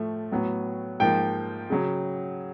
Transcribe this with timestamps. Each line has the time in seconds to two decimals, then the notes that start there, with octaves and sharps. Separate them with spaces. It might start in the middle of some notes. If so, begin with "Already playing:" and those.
Already playing: A2 F3 A3
0.32 A2 F#3 B3
1.00 G#2 F3 A#3 G5
1.70 C#3 F#3